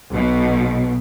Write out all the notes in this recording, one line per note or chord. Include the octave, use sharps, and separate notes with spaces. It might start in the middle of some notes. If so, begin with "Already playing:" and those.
B1 B2